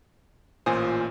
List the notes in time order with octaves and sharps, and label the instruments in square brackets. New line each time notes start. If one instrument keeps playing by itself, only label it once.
[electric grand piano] A1 A#2 C5 [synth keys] F4 G#5 D#6